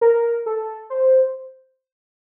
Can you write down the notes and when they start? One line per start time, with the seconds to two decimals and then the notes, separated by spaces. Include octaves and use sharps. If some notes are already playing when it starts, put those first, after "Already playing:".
0.01 A#4
0.46 A4
0.90 C5